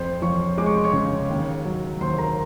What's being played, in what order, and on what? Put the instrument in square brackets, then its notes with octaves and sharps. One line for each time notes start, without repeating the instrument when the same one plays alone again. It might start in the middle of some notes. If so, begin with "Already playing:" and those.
Already playing: [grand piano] F2 C5 C6
F3 C#5 C#6
G#3 D6
C#6
C6
C#5 C#6
C#3
D#2
F#3
D#2 C5 C6
A#4 A#5